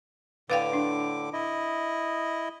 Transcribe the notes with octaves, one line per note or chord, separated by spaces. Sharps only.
A2 D3 B4 F5 G5 D6
D4
E4 D#5